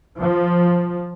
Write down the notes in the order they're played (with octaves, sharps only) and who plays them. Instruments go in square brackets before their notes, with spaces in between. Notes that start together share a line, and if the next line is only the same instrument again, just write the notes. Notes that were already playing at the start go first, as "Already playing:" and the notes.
[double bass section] F3